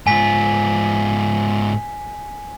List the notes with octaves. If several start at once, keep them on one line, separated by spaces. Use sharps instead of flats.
G#2 F4 G#5 B6